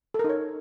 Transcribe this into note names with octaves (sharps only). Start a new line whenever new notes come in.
D#4 A4 A#4 C#5